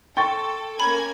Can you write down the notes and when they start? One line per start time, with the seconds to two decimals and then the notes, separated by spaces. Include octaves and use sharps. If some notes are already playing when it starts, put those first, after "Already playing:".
0.17 A4 G5 C6 C#6 A6
0.79 A#3 C#4 G#5 A#5 B5 G#6